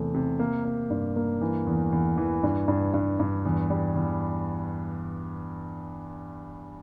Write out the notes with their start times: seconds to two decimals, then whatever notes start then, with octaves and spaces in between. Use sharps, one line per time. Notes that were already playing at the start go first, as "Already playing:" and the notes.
Already playing: E2 C3 A3
0.14 C3
0.39 A#3
0.65 A#3
0.90 G2
1.16 A#3
1.41 E3
1.67 E2
1.92 E2
2.17 E3
2.43 G2
2.68 G2
2.94 G2
3.20 G2
3.45 E2
3.70 G3
3.96 E2